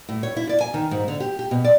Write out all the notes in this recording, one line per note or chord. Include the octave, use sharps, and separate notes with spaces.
A2
C#5
E4
D5
G#5
D#3
G#2
D3
G4
G4
B2
D5